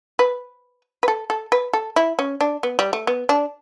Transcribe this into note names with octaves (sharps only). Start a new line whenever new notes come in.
B4
B4
A4
A4
B4
A4
E4
C#4
D4
B3
G3
A3
B3
D4